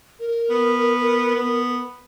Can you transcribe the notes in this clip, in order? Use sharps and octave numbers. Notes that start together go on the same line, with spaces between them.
A#4
B3
B3